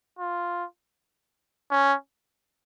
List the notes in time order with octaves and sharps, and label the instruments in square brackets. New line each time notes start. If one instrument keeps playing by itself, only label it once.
[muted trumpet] F4
C#4